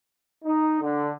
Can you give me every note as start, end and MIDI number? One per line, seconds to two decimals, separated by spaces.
0.44 0.80 63
0.81 1.12 50